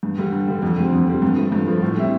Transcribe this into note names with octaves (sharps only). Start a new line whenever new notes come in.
G2
D3 G3
G2
D3 G3
F2
D3 G3 C4
F2
D3 G3 C4
G2
F3 A3
G2
F3 A3
A2
G3 C4 E4